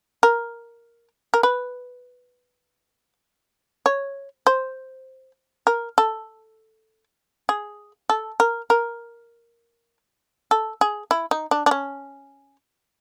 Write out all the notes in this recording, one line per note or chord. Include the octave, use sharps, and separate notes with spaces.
A#4
A#4
B4
C#5
C5
A#4
A4
G#4
A4
A#4
A#4
A4
G#4
E4
D#4
D4
D4
C#4